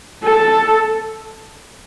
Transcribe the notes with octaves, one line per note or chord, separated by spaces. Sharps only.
A4